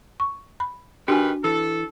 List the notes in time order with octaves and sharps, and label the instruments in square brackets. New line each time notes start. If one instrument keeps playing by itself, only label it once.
[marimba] C#6
B5
[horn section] D#3 B4 [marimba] D4 F#4 G#5 [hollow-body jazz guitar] G4
[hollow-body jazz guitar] E3 [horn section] A4 [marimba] E6